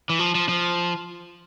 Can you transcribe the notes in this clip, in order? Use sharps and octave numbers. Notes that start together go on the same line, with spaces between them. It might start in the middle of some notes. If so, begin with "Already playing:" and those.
E3
F3
F3
F3